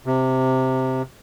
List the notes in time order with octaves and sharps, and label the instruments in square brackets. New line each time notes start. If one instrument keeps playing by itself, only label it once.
[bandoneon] C3